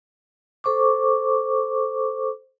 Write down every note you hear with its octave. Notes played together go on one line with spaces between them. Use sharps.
A4 C5 C#6 D6